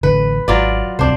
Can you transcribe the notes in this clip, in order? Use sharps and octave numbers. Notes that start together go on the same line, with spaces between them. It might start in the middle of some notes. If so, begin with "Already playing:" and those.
A1 D3 B4
G#1 F#3 F4 D5
D1 C2 C4 D4 C5